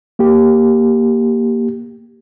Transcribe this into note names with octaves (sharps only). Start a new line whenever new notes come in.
A#3 G4